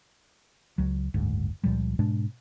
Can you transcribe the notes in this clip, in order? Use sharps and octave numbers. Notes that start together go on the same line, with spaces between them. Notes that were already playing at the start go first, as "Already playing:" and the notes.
C#2 F#3
F#1 D2 G#2
C#2 A#2 F3 G3
G#2 B2 G#3 D4